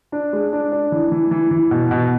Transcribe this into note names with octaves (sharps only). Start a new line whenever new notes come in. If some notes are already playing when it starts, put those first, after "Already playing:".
D4
G#3
D4
D4
E3
E3
E3
E3
B2
B2